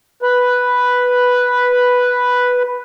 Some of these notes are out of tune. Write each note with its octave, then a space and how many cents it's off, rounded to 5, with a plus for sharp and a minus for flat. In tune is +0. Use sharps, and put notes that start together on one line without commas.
B4 +0